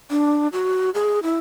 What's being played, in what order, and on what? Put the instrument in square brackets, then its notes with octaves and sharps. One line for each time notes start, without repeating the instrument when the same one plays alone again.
[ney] D4
F#4
G#4
E4